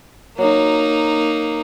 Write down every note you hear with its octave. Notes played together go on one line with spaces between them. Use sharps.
F#3 A#3 D#4